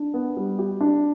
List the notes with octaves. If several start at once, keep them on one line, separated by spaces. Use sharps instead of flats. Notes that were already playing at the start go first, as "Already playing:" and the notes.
Already playing: D4
B3
G3
G4
D4